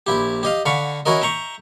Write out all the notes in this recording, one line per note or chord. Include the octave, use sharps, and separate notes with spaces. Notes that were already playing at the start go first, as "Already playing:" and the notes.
A#1 E4 G4
G4 D#5 F5
D3 F5 F#5 B5 C#6
C#4 E4 F#4 A#4 D#5
E5 G5 A#5 C#6